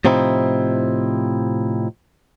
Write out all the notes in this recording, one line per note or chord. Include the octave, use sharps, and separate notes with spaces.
A2 C3 F3 C4 D#4 E4